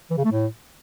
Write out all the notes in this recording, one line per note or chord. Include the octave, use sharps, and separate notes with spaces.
E3
C#3
A3
A2